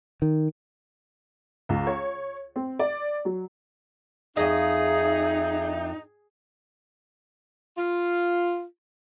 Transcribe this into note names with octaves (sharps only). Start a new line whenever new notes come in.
D#3
C#2
C#5
C4
D5
F#3
F2 D#4 G#4 D#5 E5
F4